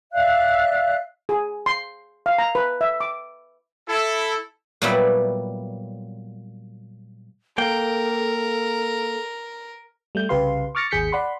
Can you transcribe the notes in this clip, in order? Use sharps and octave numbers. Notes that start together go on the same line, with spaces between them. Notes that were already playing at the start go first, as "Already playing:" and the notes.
D5 E5 F5 F#6
G#4
C6
F5
A#5
B4
E5
D6
E4 A4
A#2 F#3 G3 B3 D5 E5
A#3 A4 A#4 G5
G3 A3 G6
C2 C#3 G4 B4 F5 C6
C#6 D6 F6 A6 A#6 C#7
G#1 D#2 G#4 G6 B6 C#7
D5 F#5 B5 C6